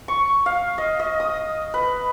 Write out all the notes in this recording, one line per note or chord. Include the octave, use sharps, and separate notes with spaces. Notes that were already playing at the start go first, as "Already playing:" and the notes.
C#6
F5
D#5
D#5
D#6
B4